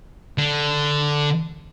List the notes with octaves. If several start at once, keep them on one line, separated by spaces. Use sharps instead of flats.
D3